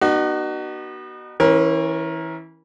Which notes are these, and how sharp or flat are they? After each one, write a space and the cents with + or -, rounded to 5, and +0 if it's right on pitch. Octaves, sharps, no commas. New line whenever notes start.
B3 -35 D#4 -35 F#4 +30
E3 -20 C#4 -30 A#4 +20